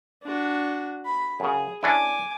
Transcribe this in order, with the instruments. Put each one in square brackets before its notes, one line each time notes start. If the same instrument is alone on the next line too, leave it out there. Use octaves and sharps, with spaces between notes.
[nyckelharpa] D4 F#4
B5
[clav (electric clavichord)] F#2 C#3 [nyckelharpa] G#4
[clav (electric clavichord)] C#4 D4 E4 [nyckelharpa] G#5 D6